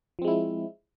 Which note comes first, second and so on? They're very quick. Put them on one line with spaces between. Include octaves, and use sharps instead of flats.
F3 C4 G#3 E4